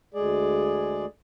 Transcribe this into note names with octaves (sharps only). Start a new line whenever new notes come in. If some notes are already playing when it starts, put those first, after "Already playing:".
D2 G#3 G#4 D5